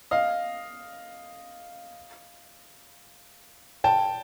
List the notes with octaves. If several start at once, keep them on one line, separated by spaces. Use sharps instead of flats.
D#5 F5
G5 A5